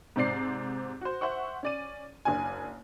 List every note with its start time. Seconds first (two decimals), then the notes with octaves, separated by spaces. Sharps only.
0.16 G#2 C3 C4 D5 C7
1.01 F#4 C5
1.21 C5 E5 F#5 C#6
1.63 C#4 D5 D#7
2.25 F#1 D4 G#5